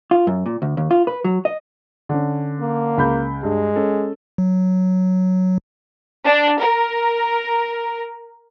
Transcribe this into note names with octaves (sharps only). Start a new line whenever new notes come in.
F4
F#2
A#2
D2
D#2
F4
B4
F#3
D#5
D3 C#4
A#3
C#2 B5 G6
G2 G#3
C#4 A4
F#3
D4
A#4